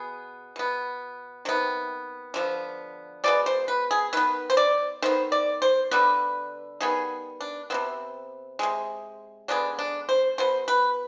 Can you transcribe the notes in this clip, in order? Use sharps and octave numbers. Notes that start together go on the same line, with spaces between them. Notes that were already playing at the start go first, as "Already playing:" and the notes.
Already playing: B2 B3 G#4
B2 B3
C3 D#3 B3
D3 F3 B3
B2 G#3 B3 D5
C5
B4
G#4
D#3 B3 B4
C5
D5
D#3 B3 C5
D5
C5
D3 G3 B3 B4
D#3 G3 B3 G#4
D4
C3 D#3 B3 C4
C3 D#3 G#3
D3 G#3 B3 D4
D4
C5
B2 B3 C5
B4